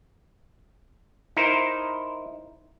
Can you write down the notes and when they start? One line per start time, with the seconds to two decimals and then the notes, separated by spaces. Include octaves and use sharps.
1.37 D#4 E4 A#4 C5